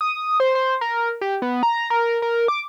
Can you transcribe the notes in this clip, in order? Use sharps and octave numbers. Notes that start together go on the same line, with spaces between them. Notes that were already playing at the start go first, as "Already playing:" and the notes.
D#6
C5
C5
A#4
G4
B3
A#5
A#4
A#4
D6